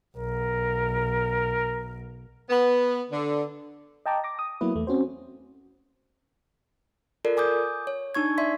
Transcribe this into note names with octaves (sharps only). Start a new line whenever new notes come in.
B1 A#4
B3
D3
D#5 G5 A5 A#5 D6
D6 A#6
D#6
F#3 A#3 B3 E4 B4
E2 A3
C4 C#4 F#4 C5
F4 A4 A#4 D5
G#5 D6 D#6 G6
C#5
D4 D#4 C#6 G#6
D5 E5 C6 B6